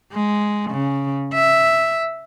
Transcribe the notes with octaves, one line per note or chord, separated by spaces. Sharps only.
G#3
C#3
E5